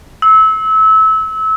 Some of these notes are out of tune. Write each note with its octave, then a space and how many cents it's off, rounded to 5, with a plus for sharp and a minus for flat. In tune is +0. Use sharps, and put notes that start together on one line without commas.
E6 -25